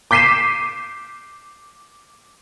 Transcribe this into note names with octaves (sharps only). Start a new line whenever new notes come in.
D6 G6 B6 C7 D#7 E7